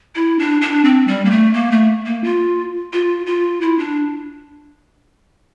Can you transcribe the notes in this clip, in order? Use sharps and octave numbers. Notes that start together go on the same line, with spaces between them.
E4
D4
D4
C4
G3
A#3
A3
A#3
A3
A#3
F4
F4
F4
E4
D4